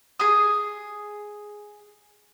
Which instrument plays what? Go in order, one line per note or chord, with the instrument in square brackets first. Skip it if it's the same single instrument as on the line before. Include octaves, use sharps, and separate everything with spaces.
[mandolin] G#4 D#6